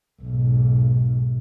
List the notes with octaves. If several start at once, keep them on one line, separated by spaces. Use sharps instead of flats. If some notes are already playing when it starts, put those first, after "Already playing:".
B1 G#2